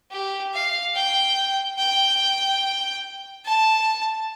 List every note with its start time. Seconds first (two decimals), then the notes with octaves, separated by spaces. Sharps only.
0.11 G4
0.54 F5
0.96 G5
1.78 G5
3.44 A5